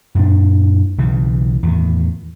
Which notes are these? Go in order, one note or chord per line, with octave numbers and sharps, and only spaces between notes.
F#2 A#2 D4
B1 C#3 E3
E2 A2 D#3